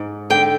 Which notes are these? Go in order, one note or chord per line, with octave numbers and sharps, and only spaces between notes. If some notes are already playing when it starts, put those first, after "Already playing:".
Already playing: G#2
D3 G5